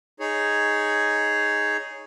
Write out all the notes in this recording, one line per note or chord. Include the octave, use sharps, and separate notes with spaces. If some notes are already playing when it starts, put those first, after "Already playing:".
D#4 G#4 C#5